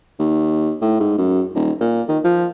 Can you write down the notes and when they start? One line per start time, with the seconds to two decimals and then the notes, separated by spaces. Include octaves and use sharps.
0.19 D#2
0.81 A2
1.00 G#2
1.18 F#2
1.55 D#1
1.81 A#2
2.08 D#3
2.24 F3